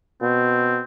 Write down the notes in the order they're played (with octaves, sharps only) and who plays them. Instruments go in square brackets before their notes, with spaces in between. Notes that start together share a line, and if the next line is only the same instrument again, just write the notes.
[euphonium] B2 [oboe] C4